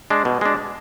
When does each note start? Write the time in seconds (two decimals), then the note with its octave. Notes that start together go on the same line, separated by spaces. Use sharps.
0.10 G#3 D4
0.25 B2
0.41 G#3 D4